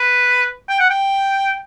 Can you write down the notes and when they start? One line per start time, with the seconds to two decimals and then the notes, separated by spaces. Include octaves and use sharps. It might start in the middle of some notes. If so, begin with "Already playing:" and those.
Already playing: B4
0.69 G5
0.80 F#5
0.90 G5